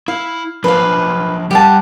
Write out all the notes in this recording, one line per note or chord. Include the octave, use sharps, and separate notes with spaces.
E4 F5
F3 D4 G#4 B4 F5
G3 G4 F#5 A5